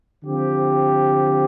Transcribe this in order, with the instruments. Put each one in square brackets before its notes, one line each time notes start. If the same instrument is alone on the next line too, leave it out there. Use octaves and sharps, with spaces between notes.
[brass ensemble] D3 F3 C4 G4